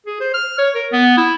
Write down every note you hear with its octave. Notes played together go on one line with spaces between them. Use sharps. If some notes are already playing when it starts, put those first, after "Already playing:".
G#4
C5
F6
C#5
A#4
B3
E4